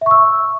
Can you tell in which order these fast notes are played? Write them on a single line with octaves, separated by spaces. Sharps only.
E5 C#6 E6